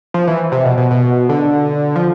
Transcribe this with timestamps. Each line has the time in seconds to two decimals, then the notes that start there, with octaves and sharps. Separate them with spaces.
0.14 F3
0.28 E3
0.52 C3
0.65 B2
0.78 B2
0.91 B2
1.29 D3
1.96 F3